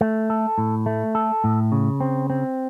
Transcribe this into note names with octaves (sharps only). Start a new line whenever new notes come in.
A3
A4
A2
A3
A4
A2
C#3
C4
C4